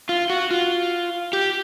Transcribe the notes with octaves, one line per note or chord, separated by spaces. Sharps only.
F4
F#4
F4
G4